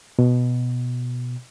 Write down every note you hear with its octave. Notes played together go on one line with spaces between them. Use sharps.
B2